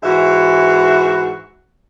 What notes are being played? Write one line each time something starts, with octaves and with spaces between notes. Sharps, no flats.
G#2 E3 F#4 E5